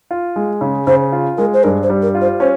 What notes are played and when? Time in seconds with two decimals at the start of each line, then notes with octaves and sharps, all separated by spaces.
0.11 F4
0.36 G#3
0.61 C#3
0.87 C#3 C5
1.12 F4
1.38 G#3 A#4
1.53 C5
1.63 G2 A#4
1.83 C5
1.90 G3
2.02 A#4
2.15 F4
2.21 C5
2.40 C#4 C5